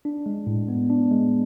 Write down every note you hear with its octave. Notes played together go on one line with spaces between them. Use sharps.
D4
G#3
A2
B3
D4
G#3